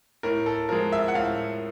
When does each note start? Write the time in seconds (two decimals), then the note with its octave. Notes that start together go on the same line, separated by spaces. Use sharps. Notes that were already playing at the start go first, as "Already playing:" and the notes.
0.23 A2 A#4
0.46 A4
0.69 F3 G#3 A#4
0.92 E5
1.08 F#5
1.15 A2 F5